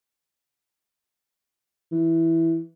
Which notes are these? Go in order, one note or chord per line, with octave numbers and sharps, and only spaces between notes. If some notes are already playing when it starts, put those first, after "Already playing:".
E3